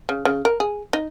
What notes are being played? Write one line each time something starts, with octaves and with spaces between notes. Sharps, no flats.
C#3
C#3
A#4
G#4
D#4